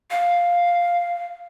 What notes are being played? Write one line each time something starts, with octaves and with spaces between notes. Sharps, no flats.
F5